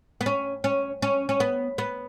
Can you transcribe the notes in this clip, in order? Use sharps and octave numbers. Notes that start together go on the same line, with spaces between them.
B3
C#4
C#4
C#4
C#4
B3
B3